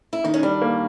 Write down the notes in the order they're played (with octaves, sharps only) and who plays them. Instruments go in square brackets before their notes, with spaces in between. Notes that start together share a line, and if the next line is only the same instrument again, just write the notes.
[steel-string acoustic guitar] E4
[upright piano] D#3 [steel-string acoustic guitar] D#4
[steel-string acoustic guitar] C#4
[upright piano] G3 [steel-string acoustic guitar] D4
[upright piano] A#3